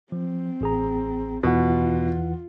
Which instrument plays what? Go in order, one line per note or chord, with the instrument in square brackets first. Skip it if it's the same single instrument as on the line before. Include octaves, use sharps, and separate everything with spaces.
[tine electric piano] F3 [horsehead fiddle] C4
[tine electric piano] A1 G#4 A#5
[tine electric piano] E2 E3 F#5 [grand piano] B2 [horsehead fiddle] F4